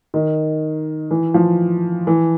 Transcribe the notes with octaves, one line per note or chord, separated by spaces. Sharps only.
D#3
E3
F3
E3